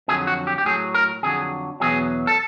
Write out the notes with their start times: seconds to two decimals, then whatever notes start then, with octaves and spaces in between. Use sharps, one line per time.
0.08 F2 D3 F#3 G#4
0.27 F#4
0.47 G4
0.58 G4
0.65 A2 F#3 G#4
0.94 A#4
1.23 F2 D3 F#3 G#4
1.80 E2 B2 F#3 G#4
2.27 A4